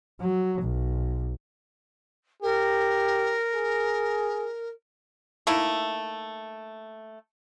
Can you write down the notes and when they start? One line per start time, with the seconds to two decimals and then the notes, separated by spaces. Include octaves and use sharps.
0.21 F#3
0.62 B1
2.42 G4 A#4
3.54 G#4
5.47 A3 A#3 D#4 E4